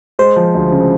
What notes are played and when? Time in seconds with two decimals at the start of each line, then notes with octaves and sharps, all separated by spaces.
0.19 G#3 C5
0.36 F3
0.55 D2
0.72 C#3